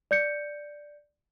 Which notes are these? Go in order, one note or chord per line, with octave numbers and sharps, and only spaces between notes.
D5 G6 C#7